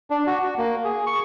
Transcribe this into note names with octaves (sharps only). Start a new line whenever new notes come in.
D4
F#4
F#4
A#3
G#4
C#6